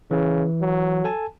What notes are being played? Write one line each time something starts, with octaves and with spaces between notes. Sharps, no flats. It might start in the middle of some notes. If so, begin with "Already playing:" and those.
C#3 E3
F#3
A4 G#5 A5